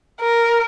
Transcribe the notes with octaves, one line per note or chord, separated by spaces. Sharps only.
A#4